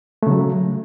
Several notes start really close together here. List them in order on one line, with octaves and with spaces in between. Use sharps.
A3 C#3 F#3